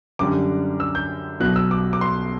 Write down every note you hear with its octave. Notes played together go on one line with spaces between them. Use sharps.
F#2 D3 G3 D6
E6
G6
B1 B2 F#3 F#6
E6
D6
D6
C6